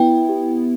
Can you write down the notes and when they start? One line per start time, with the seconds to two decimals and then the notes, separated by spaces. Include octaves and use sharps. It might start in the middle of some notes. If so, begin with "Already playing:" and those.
Already playing: B3 E4 G5
0.29 G4